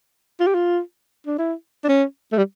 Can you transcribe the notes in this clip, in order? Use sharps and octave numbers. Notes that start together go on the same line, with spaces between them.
F4
G4
F4
D4
E4
D4
C#4
A3
G3